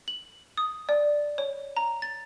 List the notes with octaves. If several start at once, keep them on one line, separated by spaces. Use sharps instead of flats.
F#7
D#6
D5
C#5
A#5
A6